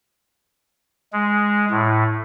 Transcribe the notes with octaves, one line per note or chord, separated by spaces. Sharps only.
G#3
A2